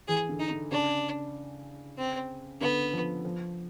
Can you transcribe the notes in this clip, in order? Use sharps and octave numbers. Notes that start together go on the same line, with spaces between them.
E3 G#4
D3
D#4
D3
C#3 D4
C4
D3 B3
F3
F3